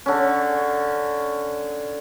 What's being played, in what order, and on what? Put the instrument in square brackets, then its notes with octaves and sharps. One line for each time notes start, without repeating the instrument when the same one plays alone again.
[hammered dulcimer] D3 C#4